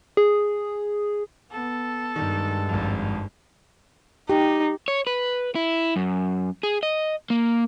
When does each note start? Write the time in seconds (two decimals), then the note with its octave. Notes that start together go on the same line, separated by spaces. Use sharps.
0.17 G#4
1.51 B3 A4
2.16 G2 D#3 G#3
2.69 G#1 F2
4.30 D#4 G4
4.88 C#5
5.07 B4
5.55 E4
5.96 F#2
6.63 G#4
6.83 D#5
7.30 A#3